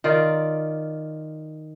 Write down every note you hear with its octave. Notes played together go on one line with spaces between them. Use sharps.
D#3 F4 D5